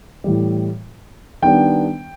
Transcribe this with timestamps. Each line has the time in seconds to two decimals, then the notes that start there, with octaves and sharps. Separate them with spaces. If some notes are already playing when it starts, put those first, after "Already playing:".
0.24 A2 E3 G3
1.42 D#3 G3 B3 D4 G5